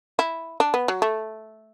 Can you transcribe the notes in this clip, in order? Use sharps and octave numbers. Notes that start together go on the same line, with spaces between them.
E4
D4
B3
F#3
A3